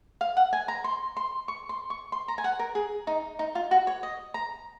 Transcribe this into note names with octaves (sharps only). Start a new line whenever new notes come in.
F5
F#5
G#5
A#5
C6
C6
C#6
C6
C#6
C6
A#5
G#5
F#5
A#4
G#4
D#4
D#4
F4
F#4
C#5
D#5
A#5